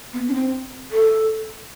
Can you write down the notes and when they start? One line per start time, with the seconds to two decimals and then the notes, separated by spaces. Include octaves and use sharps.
0.13 B3
0.28 D4
0.33 C4
0.91 A4